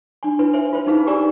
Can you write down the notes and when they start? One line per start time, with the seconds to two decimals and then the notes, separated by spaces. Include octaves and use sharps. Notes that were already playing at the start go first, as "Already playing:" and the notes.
0.23 D4 G#5
0.39 D4 E4 B4 G#5
0.53 B4 C5 E5 G#5
0.73 F4 B4 C5
0.86 C#4 D#4 E4 G#4 B4 F5
1.07 G4 G#4 D5 G#5 A#5 E6